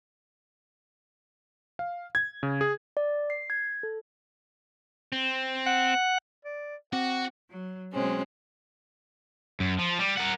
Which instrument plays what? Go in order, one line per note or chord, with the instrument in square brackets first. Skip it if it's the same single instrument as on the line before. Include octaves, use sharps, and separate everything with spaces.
[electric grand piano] F5
G#6
C#3
G#4
[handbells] D5
C7
G#6
A4
[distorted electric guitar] C4
[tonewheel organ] F#5
[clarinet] D5
[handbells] C4 [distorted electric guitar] F#4 [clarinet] F#5
[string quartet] F#3
B2 F#3 G#3 C4 C#4
[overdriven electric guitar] F#2
F3
G3
A#4 F#5